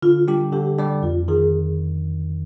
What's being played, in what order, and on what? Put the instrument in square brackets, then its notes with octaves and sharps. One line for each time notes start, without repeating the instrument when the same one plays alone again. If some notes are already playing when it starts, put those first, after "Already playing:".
[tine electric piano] D3 [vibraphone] F4
[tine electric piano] G3 D4 G4
[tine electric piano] D3 [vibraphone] G4
[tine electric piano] G3 D4 G4
[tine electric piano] F2 [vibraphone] F4
[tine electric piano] D#3 [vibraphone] G#4